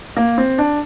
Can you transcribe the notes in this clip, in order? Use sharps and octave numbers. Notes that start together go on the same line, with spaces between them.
A#3
C4
D4